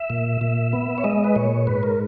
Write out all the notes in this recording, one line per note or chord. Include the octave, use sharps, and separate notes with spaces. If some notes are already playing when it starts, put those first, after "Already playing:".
Already playing: E5
A#2
A#2
B3
C#5
G#3 D#5
B4
A#2 C#5
G#2 B4
A#4